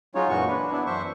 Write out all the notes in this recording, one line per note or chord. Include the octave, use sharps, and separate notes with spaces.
F#3 G#3 C#4 D#4 F4 C#5
F#2 A#2 E3 C#4 F#4 C#6
D4 B4
B3 D4 E4
F#2 E3 C5 E5 C#6